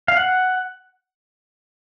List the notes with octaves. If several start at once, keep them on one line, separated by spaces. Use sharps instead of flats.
F5
F#5